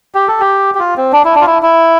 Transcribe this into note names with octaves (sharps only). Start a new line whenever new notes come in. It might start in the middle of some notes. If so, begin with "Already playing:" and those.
G4
A4
G4
G4
F4
C4
D4
E4
D4
F4
E4
E4